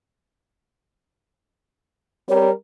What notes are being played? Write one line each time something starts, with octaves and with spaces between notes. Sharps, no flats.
G3 C4 A#4 C#5